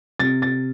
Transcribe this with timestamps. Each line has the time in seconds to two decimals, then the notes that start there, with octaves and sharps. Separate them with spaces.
0.20 C3 A6
0.42 A6